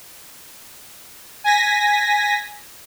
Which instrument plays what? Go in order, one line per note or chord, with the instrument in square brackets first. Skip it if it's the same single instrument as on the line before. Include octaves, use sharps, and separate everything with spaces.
[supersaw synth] G#5 A#6 B6